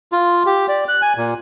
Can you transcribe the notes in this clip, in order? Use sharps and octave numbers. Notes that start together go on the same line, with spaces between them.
F4
G4
D5
F#6
G#5
A#2